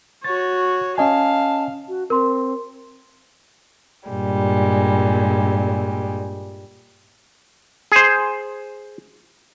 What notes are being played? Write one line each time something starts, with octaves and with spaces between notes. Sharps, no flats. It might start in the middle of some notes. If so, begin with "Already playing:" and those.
F#4 C#5 A6
C#4 D#5 F5 G#5 A5
F#4
C4 A#4 C6
G2 A#2 G3 G#3
G#4 C5